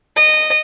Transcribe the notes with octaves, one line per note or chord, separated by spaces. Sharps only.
D#5